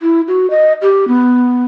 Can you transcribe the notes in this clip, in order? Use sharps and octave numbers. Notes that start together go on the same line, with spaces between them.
E4
F#4
D#5
G4
B3